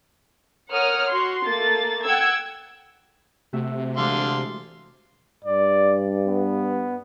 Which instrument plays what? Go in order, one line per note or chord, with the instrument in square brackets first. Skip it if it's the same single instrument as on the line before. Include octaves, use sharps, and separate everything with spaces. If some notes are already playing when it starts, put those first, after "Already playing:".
[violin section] A#4 C#5 F#5 D#6 F6
F#4 C6
A3 A#3 A6
F#5 G5 E6 G#6
[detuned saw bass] C3 [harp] A3 F#4 E5
[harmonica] D3 F5 C6 [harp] E3 G#3
[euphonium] G2 [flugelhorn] D5
[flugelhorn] B3